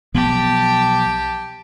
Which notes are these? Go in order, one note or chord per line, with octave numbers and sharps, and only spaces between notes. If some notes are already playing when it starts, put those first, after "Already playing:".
B1 F3 B3 G4 A5